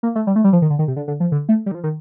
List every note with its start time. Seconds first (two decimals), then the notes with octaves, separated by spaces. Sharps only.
0.03 A#3
0.15 A3
0.27 G3
0.36 A3
0.44 G3
0.53 F3
0.62 D#3
0.70 D3
0.79 D#3
0.88 C3
0.96 D3
1.08 D3
1.20 F3
1.32 D3
1.49 A3
1.66 G3
1.71 D#3
1.75 F3
1.84 D#3